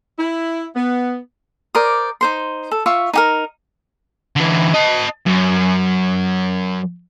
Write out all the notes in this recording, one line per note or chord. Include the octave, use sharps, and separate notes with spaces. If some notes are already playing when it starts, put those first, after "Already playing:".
E4
B3
A#4 C5 D5 D#6
D#4 C5 C6
A4
F4 E5 C#6
D#4 G4 A#4
D3 E3
D#5 A5
F#2